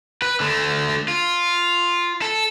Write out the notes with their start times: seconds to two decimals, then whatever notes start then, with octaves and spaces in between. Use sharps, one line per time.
0.22 B4
0.40 D3 A3
1.08 F4
2.22 A4